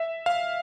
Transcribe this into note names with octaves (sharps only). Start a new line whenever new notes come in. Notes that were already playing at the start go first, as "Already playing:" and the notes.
Already playing: E5
F5